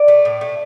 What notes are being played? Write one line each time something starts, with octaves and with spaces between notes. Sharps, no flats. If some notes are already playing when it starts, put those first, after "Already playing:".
Already playing: D5
A3
A2
A3